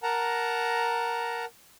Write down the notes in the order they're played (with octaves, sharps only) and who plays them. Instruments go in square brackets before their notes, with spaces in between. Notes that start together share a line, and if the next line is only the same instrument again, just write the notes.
[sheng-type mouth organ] A#4 F#5 A5 A#5